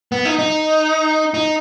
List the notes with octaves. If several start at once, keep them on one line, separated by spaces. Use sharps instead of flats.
B3
D#4
D#4
D#4